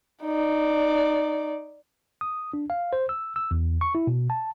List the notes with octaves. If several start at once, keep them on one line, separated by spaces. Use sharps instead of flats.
D#4 D5
D#6
D4
F5
C5
E6
E6
E2
C#6
E4
B2
A5